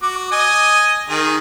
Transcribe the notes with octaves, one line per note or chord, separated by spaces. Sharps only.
F#4 D6
D#5 G#5
D#3 G#4